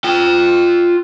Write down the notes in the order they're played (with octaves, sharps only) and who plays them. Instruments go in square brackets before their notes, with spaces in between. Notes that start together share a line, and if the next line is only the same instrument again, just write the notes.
[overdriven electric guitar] F4 G5